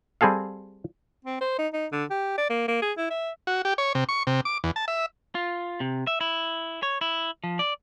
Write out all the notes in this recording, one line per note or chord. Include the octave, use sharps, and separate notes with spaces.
G3 C4 G#4 A4 F5
C4
C5
D#4
D#4
D3
G4
D5
A#3
A#3
G#4
E4
E5
F#4
G4
C#5
C3
C#6
C3
D6
E2
A5
E5
F4
C3
E5
E4
C#5
E4
F3
D5